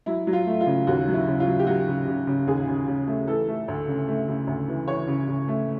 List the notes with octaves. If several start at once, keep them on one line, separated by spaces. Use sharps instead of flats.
F#3 E4
F#3
F4
A3
F4
C#3
D#2 F#4
F#3
E4
C#3
F4
F#3
G4
F#3 F#4
C#3
C#3
C#3
D#2 G#4
C#3
C#3
A3
E3 A4
A3
D2
C#3
A3
C#3
D2
E3
E3 C#5
C#3
C#3
A3